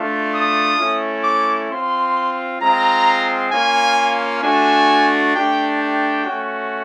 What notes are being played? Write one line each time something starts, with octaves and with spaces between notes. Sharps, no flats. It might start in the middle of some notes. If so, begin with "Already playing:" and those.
Already playing: A3 D4 F4
D#6
A3 C#4 E4
D6
C4 F4 C6
G#3 C4 F4 A#5
A#3 C#4 F4 G#5
A3 D4 F#4 G#5
A3 D4 G4 G5
G5
A3 C#4 F#4